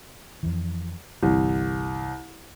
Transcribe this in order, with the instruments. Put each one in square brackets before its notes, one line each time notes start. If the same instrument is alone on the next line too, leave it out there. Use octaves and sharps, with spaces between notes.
[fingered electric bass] F2 E3
[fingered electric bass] G1 E3 [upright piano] C2